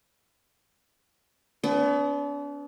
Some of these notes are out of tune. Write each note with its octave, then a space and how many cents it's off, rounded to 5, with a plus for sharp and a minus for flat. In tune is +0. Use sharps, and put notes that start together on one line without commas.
B3 +30 D4 -40